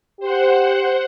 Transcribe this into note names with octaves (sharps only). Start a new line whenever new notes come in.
G4 C5 F#5